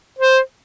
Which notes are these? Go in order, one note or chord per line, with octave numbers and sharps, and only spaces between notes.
C5